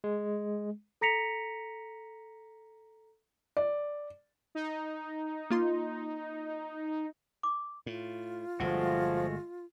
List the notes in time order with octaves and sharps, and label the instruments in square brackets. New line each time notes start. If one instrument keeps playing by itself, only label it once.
[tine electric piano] G#3
[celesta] A4 A#5 A#6 B6 C#7 F7
[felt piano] D5
[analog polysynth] D#4
[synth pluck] A#3 F4 C6
[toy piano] D6
[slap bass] A2 [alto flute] F4
[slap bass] G1 A#2 [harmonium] F3 [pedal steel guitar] G#3 A3 F#4